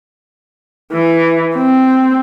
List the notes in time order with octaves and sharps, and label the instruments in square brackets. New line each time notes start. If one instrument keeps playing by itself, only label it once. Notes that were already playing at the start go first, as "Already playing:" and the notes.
[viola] E3
C4